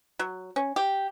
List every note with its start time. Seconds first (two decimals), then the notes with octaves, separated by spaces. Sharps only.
0.19 F#3
0.56 C#4
0.76 G4